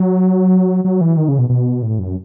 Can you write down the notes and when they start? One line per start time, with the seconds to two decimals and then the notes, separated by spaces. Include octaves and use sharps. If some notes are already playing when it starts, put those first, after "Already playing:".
Already playing: F#3
0.84 F#3
1.01 E3
1.17 D#3
1.28 C#3
1.39 B2
1.49 B2
1.82 A2
1.99 F#2